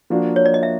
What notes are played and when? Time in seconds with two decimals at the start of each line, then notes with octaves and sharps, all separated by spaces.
0.10 F3 A#3 D4 F#4
0.36 C#5
0.46 D5
0.54 D#5
0.63 E5